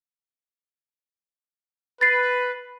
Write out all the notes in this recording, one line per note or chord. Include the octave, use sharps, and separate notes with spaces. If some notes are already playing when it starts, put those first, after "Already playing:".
B4 A6 C7